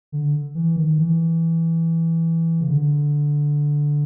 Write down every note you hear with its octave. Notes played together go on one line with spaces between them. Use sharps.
D3
E3
D#3
E3
C#3
D3